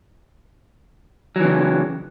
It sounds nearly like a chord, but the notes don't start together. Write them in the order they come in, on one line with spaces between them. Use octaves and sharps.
F#3 E3 C#3